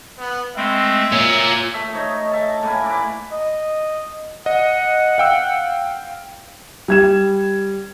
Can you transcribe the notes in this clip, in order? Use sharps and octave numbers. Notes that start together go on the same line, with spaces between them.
B3
G#3 A3 C4 E5
A#2 C#5
A3 E5
D#4 C#5 D#5
E5 A5
A2 A#3 E4 G#5
B4 D5
D#5
D#5 F#5
F5 G5 E6
G3 G#6 E7